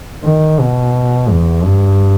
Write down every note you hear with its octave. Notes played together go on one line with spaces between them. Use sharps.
D#3
B2
E2
G2